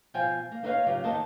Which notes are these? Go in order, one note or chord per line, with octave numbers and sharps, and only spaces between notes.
B2 F3 C5 F5 G5 G#5
A#3
A#3 D#4 E4 B4 C#5 F5
C#3 F#3 F4 G4
D#2 D#3 A#3 B3 D#5 A5